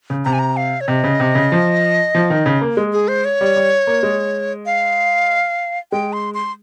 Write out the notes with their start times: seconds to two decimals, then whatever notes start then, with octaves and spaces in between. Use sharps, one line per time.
0.10 C#3
0.25 C3 A#5
0.33 G#5
0.39 A#5
0.57 F5
0.81 C#5
0.88 C3 D#5
1.04 C#3
1.20 C3
1.35 C#3
1.52 F3
2.15 F3
2.30 D#3
2.46 C#3
2.61 A#3
2.77 G#3
2.93 G#4
3.08 C5
3.25 C#5
3.41 G3
3.56 G3
3.87 A#3
4.03 G#3
4.66 F5
5.92 G#3 G5
6.13 C6
6.34 C6